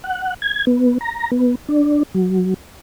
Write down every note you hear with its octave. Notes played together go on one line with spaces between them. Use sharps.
F#5
G#6
B3
A#5
B3
D4
F#3